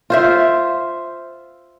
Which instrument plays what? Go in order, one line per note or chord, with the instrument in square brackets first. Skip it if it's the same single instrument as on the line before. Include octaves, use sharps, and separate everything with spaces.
[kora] F4 C5 E5